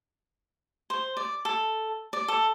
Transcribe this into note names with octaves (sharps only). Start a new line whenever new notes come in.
C5
D5
A4
D5
A4